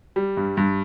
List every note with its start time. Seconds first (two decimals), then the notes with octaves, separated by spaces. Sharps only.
0.16 G3
0.37 G2
0.57 G2